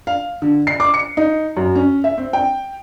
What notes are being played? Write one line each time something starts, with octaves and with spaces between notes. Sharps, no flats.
F5
D3
C7
D6
C#7
D#4
F#2
C#4
E5
C4
G5